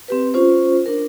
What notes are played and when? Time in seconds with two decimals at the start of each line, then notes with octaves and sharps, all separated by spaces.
0.08 C4 G4 B4
0.34 C#4 F4 C5
0.86 D4 A#4